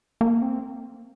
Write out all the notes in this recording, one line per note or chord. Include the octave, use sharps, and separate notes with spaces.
A#3
C4